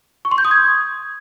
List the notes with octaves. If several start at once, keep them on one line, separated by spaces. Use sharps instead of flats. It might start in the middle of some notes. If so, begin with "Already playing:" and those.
C#6
C6
G6
D#6
G#6